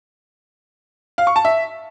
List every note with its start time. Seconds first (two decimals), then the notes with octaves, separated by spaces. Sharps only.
1.18 F5
1.27 C#6
1.36 A5
1.45 E5